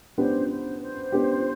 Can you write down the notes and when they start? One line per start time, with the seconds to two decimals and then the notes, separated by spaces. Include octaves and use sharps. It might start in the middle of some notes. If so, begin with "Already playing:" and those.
0.17 B3 D4 G4 C5
0.49 C5
0.81 C5
1.12 B3 D4 G4